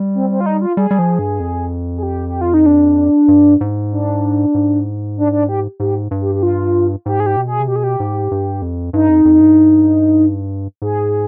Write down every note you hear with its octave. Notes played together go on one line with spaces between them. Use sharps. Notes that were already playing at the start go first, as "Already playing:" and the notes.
Already playing: G3
C4
C4
F4
D#4
F4
G3 G#4
G3
F3
G2
F2
G#4
G4
G4
F4
D#4
D4
G2
G#2
D4
G#2
D4
D4
G4
G#2 G4
G2
G4
G4
F4
G#2 G4
G#4
G4
B2
G#4
C3
B2 G4
G#4
G4
G#2
G2
F2
G2 D#4
F2
F2
G2
G#2 G#4